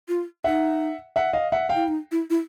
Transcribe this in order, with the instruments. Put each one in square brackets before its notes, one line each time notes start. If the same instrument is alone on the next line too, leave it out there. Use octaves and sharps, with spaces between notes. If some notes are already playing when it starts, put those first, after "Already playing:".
[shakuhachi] F4
[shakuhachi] D#4 [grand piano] E5 F#5
[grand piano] E5 F#5
D#5 F5
E5 F#5
F5 G5
[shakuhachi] E4
D#4
E4
E4